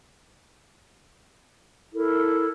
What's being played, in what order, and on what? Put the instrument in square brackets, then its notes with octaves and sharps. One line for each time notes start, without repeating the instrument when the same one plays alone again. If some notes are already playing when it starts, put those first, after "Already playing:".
[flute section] E4 A4 A#4